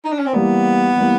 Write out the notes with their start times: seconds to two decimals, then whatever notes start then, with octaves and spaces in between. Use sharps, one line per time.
0.04 D#4
0.12 D4
0.19 C#4
0.26 C4
0.33 E3 G3 A#3 B3
0.96 E3 G3 A#3